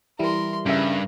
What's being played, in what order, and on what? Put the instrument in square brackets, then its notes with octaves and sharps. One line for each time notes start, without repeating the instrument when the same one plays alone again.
[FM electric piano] E3 G3 E4 [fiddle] A#4 C6
[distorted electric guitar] G2 [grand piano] C#3 E5 [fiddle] A#4